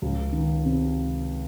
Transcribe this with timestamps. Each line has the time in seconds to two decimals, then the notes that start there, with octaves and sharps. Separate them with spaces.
0.02 C#2
0.32 D#3
0.65 C3